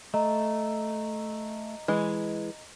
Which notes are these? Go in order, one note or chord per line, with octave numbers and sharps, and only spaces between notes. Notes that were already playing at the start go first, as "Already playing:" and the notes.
A3 D#5 A#5
E3 G#3